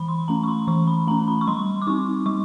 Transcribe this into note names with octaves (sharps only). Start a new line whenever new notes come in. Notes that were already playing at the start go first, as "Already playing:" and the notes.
Already playing: E3 B5
C6
A3 C#4 A#5
C#6
C6
E3 C#6
B5
A3 C#4 A#5
B5
C#6
G3 C6
D6
C4 D#4 C#6
G3 C#6